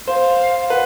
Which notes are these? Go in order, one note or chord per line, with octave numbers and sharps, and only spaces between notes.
C5 F5
B4 F#5